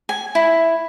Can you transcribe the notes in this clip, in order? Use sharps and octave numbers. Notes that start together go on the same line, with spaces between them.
G#5
E4